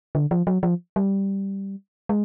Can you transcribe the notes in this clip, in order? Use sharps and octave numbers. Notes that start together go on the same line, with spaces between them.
D3
F3
F#3
F3
G3
G#3